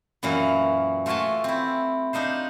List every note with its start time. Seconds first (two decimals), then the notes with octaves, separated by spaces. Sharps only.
0.23 F#2 A#2 E3 F#4 F5
1.06 A3 F4 F#4 E5 G#5 A5
1.44 C4 E4
2.13 D4 D#4 F4 C5